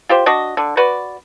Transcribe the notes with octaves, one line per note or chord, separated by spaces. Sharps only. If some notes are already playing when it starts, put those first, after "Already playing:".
F4 G4 C5
D4 F#4 D#5
D3
F#4 B4 D5